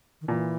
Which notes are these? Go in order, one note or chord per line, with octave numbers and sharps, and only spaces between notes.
D#3
A#2 E3